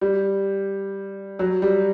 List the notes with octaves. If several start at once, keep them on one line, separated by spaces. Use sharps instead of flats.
G3
F#3
G3